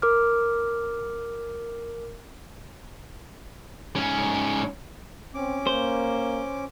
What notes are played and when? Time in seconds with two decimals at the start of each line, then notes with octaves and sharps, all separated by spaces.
0.02 A#4 D6 F6
3.96 G#2 C#4
5.34 C4 C#4 D6
5.67 A#3 C5